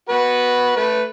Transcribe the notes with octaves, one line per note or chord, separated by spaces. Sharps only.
F#4 B4
A3 B4